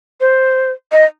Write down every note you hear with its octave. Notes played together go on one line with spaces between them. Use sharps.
C5
D#5